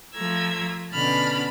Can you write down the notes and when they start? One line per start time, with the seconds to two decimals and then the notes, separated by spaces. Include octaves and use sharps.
0.16 F3 A3 A#5 E6 G#6
0.93 B2 D3 C#4 A5 B5 F6